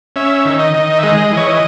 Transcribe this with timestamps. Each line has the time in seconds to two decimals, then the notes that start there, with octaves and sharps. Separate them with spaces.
0.16 C#4 E5
0.45 D#3
0.59 D#5
0.74 D#3
0.98 E5
1.03 G#3 D#5
1.32 E3
1.37 C#5
1.47 D#5